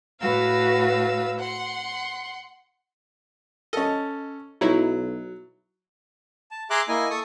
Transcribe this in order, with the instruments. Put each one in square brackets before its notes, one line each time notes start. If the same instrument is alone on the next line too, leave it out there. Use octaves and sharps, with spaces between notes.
[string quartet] A2 F#4 B4 F5 E6
F#5 C6
[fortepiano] C#4 A4 [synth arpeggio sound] D#5
[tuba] B1 [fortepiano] F#3 [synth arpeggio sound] D#4 E4 C#5
[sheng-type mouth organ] A5
G#4 E5 A#5 C6 D6 F#6
A#3 E4 D#5 G#5
A4 C#6 D#6